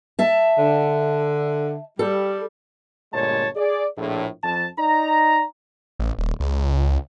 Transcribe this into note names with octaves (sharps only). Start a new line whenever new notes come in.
E5 A5
D3
G3 A4
G1 A#2 G#3 C#5 A5
G#4 D5
A#1 A2
F2 A5
D#4 D5 A#5
A1
D#1
C#2